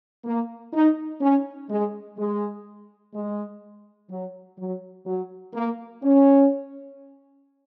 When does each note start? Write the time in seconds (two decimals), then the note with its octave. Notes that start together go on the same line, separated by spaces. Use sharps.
0.25 A#3
0.73 D#4
1.21 C#4
1.69 G#3
2.17 G#3
3.14 G#3
4.10 F#3
4.59 F#3
5.06 F#3
5.54 A#3
6.03 C#4